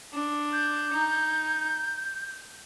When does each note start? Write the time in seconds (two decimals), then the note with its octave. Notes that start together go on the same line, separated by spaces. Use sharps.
0.13 D4
0.53 G6
0.93 D#4